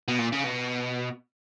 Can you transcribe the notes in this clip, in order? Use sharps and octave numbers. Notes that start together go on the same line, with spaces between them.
B2
A#2
C#3
B2